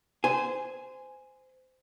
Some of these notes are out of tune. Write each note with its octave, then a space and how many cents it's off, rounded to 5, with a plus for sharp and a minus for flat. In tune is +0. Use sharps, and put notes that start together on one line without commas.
C5 -20 G#5 +0